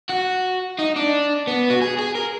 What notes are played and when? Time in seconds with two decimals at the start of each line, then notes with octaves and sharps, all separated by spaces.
0.10 F#4
0.79 D#4
0.96 D4
1.47 B3
1.70 F#4
1.81 G#4
1.99 G#4
2.15 A#4